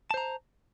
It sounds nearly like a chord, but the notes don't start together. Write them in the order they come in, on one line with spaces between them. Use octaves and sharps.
A5 C5 A#5